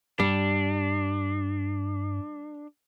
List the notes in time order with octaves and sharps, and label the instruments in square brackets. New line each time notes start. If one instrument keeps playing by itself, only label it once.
[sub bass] G2 [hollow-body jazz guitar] G3 [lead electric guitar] D4